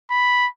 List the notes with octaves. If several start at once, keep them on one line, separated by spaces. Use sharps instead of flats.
B5